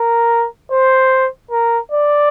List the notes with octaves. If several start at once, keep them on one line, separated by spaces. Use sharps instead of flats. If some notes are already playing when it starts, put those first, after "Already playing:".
Already playing: A#4
C5
A#4
D5